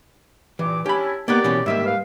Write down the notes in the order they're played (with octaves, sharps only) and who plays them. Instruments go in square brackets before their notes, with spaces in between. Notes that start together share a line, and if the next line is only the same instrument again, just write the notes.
[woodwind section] G2 A#2 D6 [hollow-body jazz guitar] E3
[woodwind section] C#4 D4 E4 [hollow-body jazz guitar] G4 B5
[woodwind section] D#3 G4 D5 [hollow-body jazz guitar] A#3 B3 B4
[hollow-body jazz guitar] B2 E3 C#4
[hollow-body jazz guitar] G#2 G3 A#3 [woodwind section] D#3 E5
[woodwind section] B4 F5